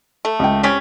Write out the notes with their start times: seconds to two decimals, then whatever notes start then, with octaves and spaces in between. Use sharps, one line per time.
0.25 A3
0.39 C#2 G5
0.63 G3 C4 C#4 B6